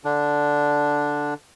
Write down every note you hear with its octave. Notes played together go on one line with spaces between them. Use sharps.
D3 D4